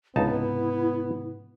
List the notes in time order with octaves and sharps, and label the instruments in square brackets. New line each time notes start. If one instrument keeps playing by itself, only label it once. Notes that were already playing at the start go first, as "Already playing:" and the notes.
[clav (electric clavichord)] C#2 D#4 A5 [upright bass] G#2 C3 [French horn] B3 [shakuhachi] E4